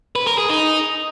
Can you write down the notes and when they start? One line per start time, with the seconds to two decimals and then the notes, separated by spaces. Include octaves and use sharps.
0.16 B4
0.27 A#4
0.38 G#4
0.49 D#4